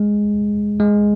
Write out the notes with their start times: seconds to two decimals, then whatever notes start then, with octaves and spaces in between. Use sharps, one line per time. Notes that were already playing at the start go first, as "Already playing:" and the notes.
Already playing: G#3
0.80 G#3